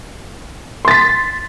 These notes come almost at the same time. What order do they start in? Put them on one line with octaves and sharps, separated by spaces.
C6 A6 B6